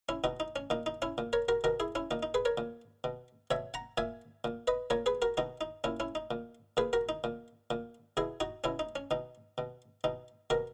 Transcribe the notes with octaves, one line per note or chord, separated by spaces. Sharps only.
C#4 E4
B2 D#4 F#4
D#4
C#4
A#2 D#4
D#4
C#4 E4
A#2
A#4 C#5
F#4 A#4
B2 F#4 A#4
E4 G#4
C#4 E4
A#2 D#4
D#4
G#4 B4
A#4 C#5
A#2
B2
B2 C#5 E5
F#5 A#5
A#2 E5 G#5
A#2
B4 D#5
A#2 A#4 C#5
G#4 B4
F#4 A#4
B2 D#4 F#4
D#4
A#2 C#4 E4
C#4 E4
D#4
A#2
A#2 G#4 B4
F#4 A#4
D#4
A#2
A#2
B2 E4 G#4
D#4 F#4
B2 C#4 E4
D#4
C#4
B2 D#4
B2
B2 D#4
B2 F#4 A#4